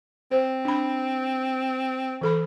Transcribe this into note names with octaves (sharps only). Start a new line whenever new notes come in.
C4 C5
D4 B5
E3 A4 B5